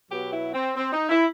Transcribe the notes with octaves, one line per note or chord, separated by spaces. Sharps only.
B2 F#3 B3 G4
E4
C4
C4
D#4
E4